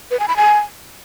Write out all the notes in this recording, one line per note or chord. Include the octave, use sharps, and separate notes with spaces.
B4
G#5
B5
G#5